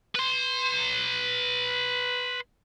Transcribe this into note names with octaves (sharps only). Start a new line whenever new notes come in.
B4 C6